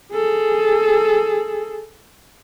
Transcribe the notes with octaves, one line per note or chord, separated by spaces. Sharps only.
G#4 A4